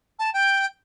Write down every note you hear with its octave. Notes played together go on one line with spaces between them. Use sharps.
A5
G5